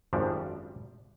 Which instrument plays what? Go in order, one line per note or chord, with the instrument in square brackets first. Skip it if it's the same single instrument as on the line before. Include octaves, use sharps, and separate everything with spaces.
[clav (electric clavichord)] G#1 F#2 F3 G3 D4